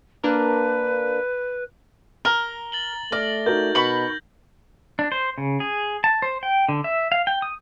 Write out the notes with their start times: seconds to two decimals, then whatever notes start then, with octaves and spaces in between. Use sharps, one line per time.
0.24 A#3 D4 A#4 B4
2.25 A#4 A#5 G7
2.72 A6 F#7 G7
3.12 A3 D5 F6 A#6
3.46 D#4 F#4 A#4 G6
3.75 B2 B5 C#6
4.99 D4
5.12 C5
5.38 C#3
5.60 G#4
6.04 A5
6.22 C5
6.43 G5
6.69 D3
6.84 E5
7.12 F5
7.27 G5
7.42 D#6